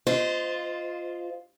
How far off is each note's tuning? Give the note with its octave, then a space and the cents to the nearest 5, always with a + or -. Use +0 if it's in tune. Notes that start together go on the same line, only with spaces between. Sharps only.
F4 +0 C5 -20 D#5 +0